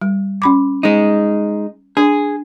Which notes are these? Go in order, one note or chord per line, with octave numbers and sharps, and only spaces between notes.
G3
C#4 B5 D6
G#3 D#4
D4 G#4